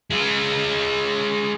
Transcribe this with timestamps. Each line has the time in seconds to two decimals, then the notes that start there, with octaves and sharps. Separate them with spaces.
0.10 G#3 F4